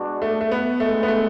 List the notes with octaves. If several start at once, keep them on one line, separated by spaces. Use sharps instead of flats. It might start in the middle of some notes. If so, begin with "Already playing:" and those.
Already playing: B2 G#3 D4 F#4
A3
A3
B3
D2 C#3 G#3 A3
B3
A3